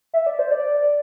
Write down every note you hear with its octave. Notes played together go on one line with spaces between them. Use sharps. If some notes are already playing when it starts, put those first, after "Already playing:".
E5
D5
C5
D5